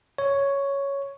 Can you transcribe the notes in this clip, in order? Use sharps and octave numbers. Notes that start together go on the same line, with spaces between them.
C#5